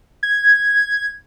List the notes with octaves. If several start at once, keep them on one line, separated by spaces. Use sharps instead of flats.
G#6